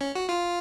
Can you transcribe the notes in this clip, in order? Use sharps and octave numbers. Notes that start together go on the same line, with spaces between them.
C#4
F#4
F4